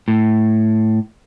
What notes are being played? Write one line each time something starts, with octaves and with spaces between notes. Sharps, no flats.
A2